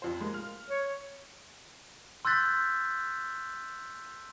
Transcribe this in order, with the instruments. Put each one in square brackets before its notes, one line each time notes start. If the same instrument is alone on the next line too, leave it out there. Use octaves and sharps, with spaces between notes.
[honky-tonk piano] F2 C5
G#3 A#3
F6
[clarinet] C#5
[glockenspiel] C6 E6 F#6 G6 A6 B6